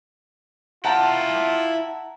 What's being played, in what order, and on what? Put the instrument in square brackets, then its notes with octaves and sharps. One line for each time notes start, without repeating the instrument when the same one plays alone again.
[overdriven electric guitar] E4 G5 [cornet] F4 [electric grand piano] F#5 A5 A#5